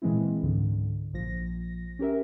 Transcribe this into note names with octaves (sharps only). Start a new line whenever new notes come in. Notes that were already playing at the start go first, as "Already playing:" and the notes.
A#2 E3 G#3 C4 E4
C#2 G#2 D3
A#1 F3 A#6
C#4 G4 A#4 E5